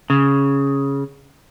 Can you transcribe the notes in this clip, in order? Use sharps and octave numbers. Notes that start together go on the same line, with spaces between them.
C#3